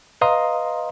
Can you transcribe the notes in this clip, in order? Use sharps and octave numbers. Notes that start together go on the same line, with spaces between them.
B4 D#5 F5 A#5 C6 D#6